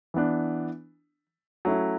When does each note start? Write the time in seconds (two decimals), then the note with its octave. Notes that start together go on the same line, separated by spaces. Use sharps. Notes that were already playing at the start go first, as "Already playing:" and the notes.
0.14 E3 B3 D4
1.65 F#3 A3 C#4 E4